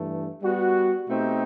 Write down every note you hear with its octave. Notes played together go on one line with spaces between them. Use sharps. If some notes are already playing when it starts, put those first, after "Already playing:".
Already playing: G2 E3 A3
G3 B3 F#4
B2 A3 C4 D#4 G4